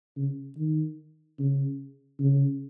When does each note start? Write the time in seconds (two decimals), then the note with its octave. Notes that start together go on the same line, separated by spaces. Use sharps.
0.17 C#3
0.58 D#3
1.39 C#3
2.19 C#3